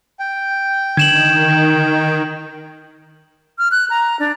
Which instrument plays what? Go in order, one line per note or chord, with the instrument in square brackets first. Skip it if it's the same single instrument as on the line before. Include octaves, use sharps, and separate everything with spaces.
[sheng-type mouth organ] G5
[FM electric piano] D3 [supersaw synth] D#3 [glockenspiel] G#6 E7 F#7
[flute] F6
F#6
A#5
D4